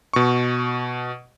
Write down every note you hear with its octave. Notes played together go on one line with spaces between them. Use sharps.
B2 C#6